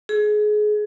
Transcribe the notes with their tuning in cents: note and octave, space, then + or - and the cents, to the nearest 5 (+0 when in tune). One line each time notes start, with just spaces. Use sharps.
G#4 +25